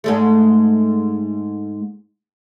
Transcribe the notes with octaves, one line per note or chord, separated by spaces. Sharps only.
G#2 G#3 A3